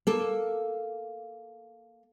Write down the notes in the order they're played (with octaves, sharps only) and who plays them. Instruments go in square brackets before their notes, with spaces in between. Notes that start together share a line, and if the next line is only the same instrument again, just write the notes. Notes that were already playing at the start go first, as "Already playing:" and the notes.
[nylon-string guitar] A#3 A4